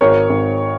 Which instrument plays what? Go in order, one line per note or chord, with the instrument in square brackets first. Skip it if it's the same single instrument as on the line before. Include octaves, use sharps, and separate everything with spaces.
[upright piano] G#1 A#4 C#5
G#1